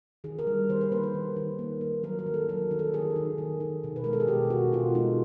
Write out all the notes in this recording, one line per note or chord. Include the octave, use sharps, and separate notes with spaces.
D#3 G#4
A#4
G3
D#3 C5
B4
A#3 B4
B4
D#3
D#3
A#3
A#3
F#3 A#4
A#4
D#3
A4
F#3 A#4
D#3
A4
D#3 G#4
D#3
D#3
D#3
B2
B4
G#3 A#4
A4
G#4
B2 G4
B2 F#4
B2 F4
G#3 D#4